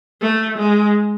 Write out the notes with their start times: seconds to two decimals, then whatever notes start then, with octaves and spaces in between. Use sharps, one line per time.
0.21 A3
0.58 G#3